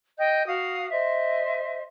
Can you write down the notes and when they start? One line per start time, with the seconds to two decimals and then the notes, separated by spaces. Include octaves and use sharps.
0.19 D#5 G5 G6
0.46 F#4 F5 D#6
0.90 C5 D#5 E5